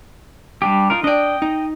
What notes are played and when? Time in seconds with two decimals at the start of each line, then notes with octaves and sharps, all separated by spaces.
0.62 G3 D4 G4
0.90 D#4 F4 A#4
1.04 D4 D5 D#5 G5
1.42 D#4